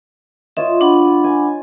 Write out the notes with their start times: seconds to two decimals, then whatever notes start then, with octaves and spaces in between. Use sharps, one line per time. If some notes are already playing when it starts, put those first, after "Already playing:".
0.57 F4 C#5 D#5 E5
0.81 D4 F#5 B5
1.24 G#5